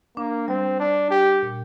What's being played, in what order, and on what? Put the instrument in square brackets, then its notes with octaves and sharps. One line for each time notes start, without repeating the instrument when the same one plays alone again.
[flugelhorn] A#3 [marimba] D4
[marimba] G3 [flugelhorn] C4
[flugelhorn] D4
G4
[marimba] A#2